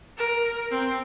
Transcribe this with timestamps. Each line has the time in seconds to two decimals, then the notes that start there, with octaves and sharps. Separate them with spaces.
0.17 A#4
0.71 C4